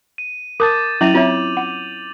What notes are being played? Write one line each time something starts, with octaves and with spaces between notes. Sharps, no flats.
D#7
A#4 A5 D6 D#6 G6 A6
F#3 C#4 E4 E5 D#7 F7 F#7
C4 F4 C#5 E5
F#5